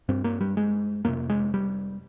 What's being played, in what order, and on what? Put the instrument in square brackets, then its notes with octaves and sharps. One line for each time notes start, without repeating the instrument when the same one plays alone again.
[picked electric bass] G2 C4
A#3
G3
G#3
F2 C3 A#3
G#3
G3